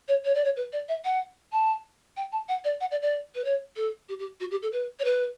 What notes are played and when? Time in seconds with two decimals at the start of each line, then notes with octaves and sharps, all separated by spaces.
0.08 C#5
0.25 C#5
0.34 D5
0.45 C#5
0.56 B4
0.73 D5
0.88 E5
1.05 F#5
1.52 A5
2.17 G5
2.32 A5
2.48 F#5
2.64 D5
2.80 F#5
2.91 D5
3.02 D5
3.35 B4
3.44 C#5
3.76 A4
4.09 G4
4.19 G4
4.40 F#4
4.51 G4
4.62 A4
4.72 B4
4.99 C#5
5.04 B4